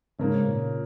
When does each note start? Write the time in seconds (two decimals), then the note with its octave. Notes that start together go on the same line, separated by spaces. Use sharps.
0.19 G#2 C#3 A#3 C#4
0.47 A#2